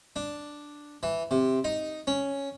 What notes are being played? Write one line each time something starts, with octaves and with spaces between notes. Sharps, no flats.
D4
E3
C3
D#4
C#4